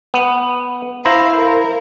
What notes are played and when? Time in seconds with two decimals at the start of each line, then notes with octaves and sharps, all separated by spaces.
0.14 B3
1.05 E4 C5 F5 A#5
1.37 A#4